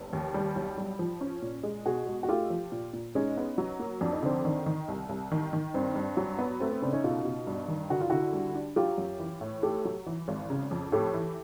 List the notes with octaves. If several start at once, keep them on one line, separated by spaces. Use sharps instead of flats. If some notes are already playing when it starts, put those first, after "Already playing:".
Already playing: F1
D#2
G3
B1
G3
F3
C#4
A#2
G#3
B2 F#4 G#4
G#3
F#4
A3 F4 G4
F3
A#2
A#2
G#3 C#4 D#4
B3
F#3
A#3
F2 D4
D#4
D3 C4 D4
D#3
D#3
C2
C2
D#3
D#3
G2 C4
G2
F#3
B3
A3 C4
C4
C#3 C4 D4
C#4 D#4
B2 D#4 F4
B2
G2
D#3
D3 F#4
F4
D3 E4 F#4
G3
D4
F#3 F4 G4
F#2
E3
A2
A3 G4 A4
F#3
E3
G#1
C#3
F2
A2 G4 A4
E3